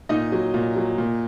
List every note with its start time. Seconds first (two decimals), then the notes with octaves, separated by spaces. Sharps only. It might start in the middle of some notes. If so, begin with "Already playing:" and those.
0.09 A#2 D#4 D#5
0.32 F#3
0.54 A#2
0.76 F#3
0.98 A#2